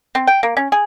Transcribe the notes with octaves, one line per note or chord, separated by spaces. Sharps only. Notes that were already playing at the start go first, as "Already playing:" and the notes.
C4
G5
A#3
C#4
G#4